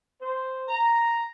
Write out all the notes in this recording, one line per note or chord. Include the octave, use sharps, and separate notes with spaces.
C5
A#5